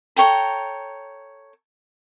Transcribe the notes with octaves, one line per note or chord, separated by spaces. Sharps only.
A4 C#5 G5 A#5